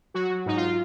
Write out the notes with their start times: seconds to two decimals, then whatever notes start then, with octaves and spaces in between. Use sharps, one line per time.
0.14 F#3 F#4
0.30 F#3
0.46 G#2 D#4
0.57 F4